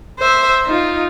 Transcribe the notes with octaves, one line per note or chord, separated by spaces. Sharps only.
C5 E5
D#4 F4